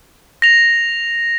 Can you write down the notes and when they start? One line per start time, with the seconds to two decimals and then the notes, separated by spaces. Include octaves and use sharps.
0.42 A#6 F7